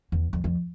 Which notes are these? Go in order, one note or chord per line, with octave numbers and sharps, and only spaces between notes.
E2
F2
F2